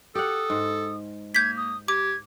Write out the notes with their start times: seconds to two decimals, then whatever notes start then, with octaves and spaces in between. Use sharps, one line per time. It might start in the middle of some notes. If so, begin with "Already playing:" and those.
0.15 G4 A4 F#5 D#6
0.50 G#2
1.35 A#3 G6 G#6 B6
1.57 D#6
1.88 G4 D6 G#6